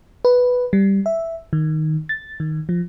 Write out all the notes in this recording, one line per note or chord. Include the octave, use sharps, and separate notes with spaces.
B4
G3
E5
D#3
A6
D#3
F3